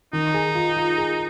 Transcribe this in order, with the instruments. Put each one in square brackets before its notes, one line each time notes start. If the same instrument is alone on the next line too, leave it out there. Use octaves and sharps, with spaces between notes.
[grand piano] D#3 [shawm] D#4
[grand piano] G#4
F4
F4
G#4